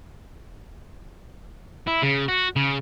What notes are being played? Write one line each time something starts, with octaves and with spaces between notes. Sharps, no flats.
E4
C#3
F#4
C#3